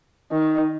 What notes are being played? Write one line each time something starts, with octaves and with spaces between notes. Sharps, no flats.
D#3